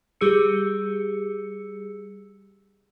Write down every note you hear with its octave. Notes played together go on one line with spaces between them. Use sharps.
G3 G4 G#4 E6 C#7